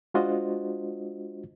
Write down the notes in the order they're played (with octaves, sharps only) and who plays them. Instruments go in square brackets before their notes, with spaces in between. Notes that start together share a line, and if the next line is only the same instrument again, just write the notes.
[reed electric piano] G#3 D4 F4 F#4 C5 D#5